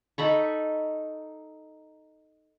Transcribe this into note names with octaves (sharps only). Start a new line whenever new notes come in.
D#4 A4 B5 C#6